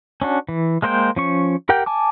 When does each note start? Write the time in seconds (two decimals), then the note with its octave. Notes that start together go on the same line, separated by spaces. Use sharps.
0.22 C#4 D4 F#4
0.49 E3
0.82 G#3 A#3 C5 D5 G5
1.16 F3 C#4 C#6
1.69 G4 A#4 F#5 G5 G6
1.86 G#5 A5 D6